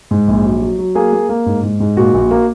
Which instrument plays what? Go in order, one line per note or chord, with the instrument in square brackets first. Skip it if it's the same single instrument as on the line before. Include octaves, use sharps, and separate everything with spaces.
[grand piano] G#2
A#1
F#3
F#3
F#3
A#3 G#4
A#3
A#3
G#2
G#2
G#2
A#2 F#4
A#1
A#3